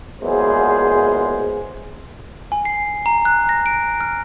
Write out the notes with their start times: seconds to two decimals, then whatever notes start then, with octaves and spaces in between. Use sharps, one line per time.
0.22 E2 A#2 F#3 G#3 G#4 C5
2.52 G#5
2.65 C7
3.06 A#5
3.25 F#6
3.49 A#6
3.66 D7
4.01 F6